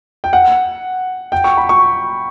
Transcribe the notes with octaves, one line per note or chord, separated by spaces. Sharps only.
G5
F#5
G5
C#6
B5
C#6